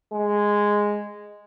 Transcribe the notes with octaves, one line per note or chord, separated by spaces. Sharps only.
G#3